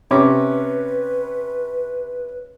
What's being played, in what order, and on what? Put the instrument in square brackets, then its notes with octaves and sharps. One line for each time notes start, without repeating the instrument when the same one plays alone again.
[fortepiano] C3 C#4 D6 [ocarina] B4